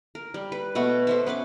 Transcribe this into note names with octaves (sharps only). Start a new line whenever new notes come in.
A#4
G3
B4
B2 A3 B3 F#4
A4 C5 E5
B3 C#4 B4 D6